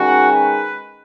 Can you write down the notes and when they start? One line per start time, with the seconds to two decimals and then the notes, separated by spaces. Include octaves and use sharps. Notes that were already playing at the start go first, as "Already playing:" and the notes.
Already playing: D#3 G#3 C#4 F#4
0.33 B4